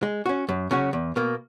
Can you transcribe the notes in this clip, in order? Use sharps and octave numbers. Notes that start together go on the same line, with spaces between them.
G#3
C#4 F#4
F#2
C#3 F#3 C#4 F#4
E2
B2 A#3